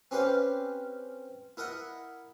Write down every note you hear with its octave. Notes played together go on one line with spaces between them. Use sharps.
C4 C#4 G4 B4 F5
E4 A#4 D#5 F#5